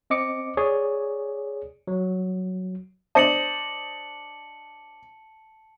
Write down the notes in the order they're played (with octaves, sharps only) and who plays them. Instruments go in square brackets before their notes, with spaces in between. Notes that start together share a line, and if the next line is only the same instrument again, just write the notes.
[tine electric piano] C4 D#5 D6 C#7
G#4 C#5 D5
F#3
[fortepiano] D4 C5 D#5 [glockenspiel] A5 C#7 F#7